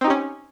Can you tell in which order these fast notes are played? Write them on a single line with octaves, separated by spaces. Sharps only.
C4 D#4 G4 C#4